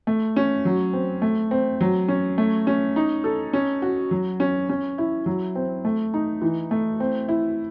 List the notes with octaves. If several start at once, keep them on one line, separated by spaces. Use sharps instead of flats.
A3
C#4
F#3
C4
A3
C4
F#3
C#4
A3
C#4
D#4
A4
C#4
F#4
F#3
C#4
C#4
E4
F#3
C4
A3
D#4
E3
A3
C4
E4